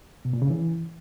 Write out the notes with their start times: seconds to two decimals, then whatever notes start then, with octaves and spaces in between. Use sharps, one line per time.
0.25 B2
0.33 A#2
0.42 C#3
0.50 E3